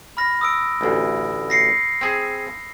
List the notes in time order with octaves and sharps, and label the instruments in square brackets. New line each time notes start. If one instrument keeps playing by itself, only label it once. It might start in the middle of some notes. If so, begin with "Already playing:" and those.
[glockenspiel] B5 F6 A#6
D#6 E6 D7
[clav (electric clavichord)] A1 D2
[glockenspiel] A#6 C7 C#7
[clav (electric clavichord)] C4 G#4